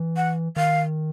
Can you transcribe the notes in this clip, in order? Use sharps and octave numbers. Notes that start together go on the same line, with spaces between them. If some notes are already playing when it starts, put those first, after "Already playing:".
Already playing: E3
F#5
D#3 F5